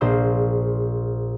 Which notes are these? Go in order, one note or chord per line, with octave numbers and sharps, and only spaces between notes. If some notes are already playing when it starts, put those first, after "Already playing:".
A#1 F4 G#4 C5 C6 E6